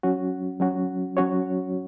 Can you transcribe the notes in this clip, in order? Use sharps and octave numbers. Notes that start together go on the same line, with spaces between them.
F#3 C#4 F#4
F#3 C#4 F#4
F#3 C#4 F#4 C#5